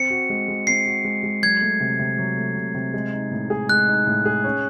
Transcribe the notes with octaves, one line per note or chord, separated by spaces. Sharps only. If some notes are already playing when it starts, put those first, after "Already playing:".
Already playing: C4 C#7
F#4
G#3
G#3
C4 C7
F#4
G#3
G#3
F#3 G#6
A3
C3
C3
F#3
A3
C3
C3
G#3
D#4
A2
G#4
G#3 F#6
D#4
A2
G#4
C#4